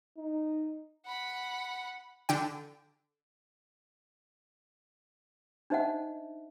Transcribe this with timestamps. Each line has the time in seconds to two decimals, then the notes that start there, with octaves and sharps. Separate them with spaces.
0.17 D#4
1.06 F#5 B5
2.29 D3 G5
5.70 D4 D#4 C5 D#5 E5 F#5